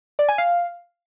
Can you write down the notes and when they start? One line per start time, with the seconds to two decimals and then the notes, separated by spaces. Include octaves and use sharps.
0.19 D5
0.29 G#5
0.38 F5